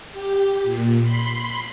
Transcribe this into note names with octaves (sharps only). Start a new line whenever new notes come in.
G4
A#2
B5 C6